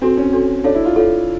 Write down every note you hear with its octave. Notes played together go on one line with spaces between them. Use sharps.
C4 D4 F#4 A4
C#4
D4 F#4 A4
D4 A4 C#5 F5
E4
F4
F4 A4 C#5 F5